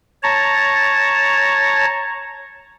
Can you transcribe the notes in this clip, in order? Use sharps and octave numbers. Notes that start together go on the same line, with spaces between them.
C#5 A5 A#5